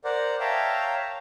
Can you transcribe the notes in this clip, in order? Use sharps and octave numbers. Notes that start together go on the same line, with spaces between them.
A#4 C5 D5 F#5
C#5 E5 F5 G5 A5 A#5